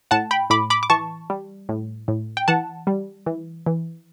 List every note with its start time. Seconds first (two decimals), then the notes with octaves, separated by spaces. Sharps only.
0.11 A2 F#5 A5
0.31 G5 B5
0.50 A2 B5 D6
0.70 B5 D6
0.83 D6
0.90 E3 A5 C#6
1.30 G3
1.69 A2
2.08 A2
2.37 G5
2.48 E3 F#5 A5
2.87 G3
3.26 E3
3.66 E3